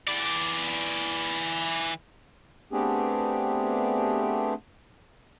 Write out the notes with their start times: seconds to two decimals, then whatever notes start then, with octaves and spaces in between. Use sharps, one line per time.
0.07 E3 D5
2.72 A3 B3 C4 D4 G4 G#4